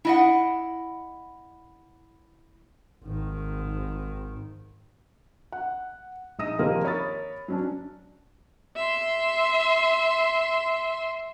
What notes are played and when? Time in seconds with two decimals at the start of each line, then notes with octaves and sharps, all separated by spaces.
0.05 E4 D#5 F#5
3.04 G#1 D#3
5.52 F#5
6.39 A#1 D#4 D#6 A#6 D#7
6.59 D#3 F3 A#3 C4 G4 A#4
6.83 A#4 C#5 B5 D#6 A6
7.48 F#3 C#4 D4
8.76 E5 C6